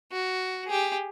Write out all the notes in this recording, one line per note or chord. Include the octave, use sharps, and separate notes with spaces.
F#4
G4 G#4